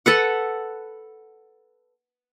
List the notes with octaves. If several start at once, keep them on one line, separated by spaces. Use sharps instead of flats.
A4 B4 F#5